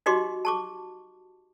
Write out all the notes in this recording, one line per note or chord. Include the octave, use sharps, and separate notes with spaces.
D#4 F#4 G4 D#5 C6 D6
A5 C#6 D6